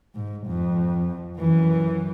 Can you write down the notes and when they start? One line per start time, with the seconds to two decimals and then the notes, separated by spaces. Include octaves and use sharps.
0.15 G#2
0.47 F2
1.39 F#2 E3